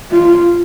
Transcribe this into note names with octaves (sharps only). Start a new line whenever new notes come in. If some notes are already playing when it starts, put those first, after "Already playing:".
F4